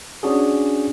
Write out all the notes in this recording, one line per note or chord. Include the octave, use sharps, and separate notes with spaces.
C#4 D4 F#4 G#4